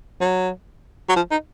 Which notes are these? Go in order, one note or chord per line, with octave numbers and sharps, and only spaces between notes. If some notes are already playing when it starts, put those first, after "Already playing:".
F#3
F#3
F3
D#4